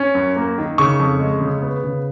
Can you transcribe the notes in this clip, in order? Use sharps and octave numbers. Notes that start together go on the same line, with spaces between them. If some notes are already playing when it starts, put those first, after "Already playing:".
Already playing: C#4
F#2
A#3
D#3
C#3 C#6
F2
G#3
C#3
B3
C#3